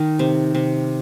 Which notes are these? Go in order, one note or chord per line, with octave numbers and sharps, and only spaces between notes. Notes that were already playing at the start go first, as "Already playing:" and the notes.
Already playing: D#3
C3
C3